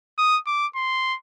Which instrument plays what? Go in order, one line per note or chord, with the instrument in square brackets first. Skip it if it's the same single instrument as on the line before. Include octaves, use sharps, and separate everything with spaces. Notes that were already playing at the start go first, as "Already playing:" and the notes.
[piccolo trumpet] D#6
D6
C6